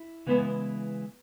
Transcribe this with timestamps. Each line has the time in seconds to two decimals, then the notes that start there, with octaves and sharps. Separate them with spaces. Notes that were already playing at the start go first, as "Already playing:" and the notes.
Already playing: E4
0.27 C#3 E3 G#3 B3 E4